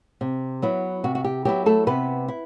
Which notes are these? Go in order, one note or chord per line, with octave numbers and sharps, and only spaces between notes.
C3
F#3 B3 E4
C3 F#4
F#4
G4
F#3 B3 E4 G4
A3 A4
C3 B3 B4
E4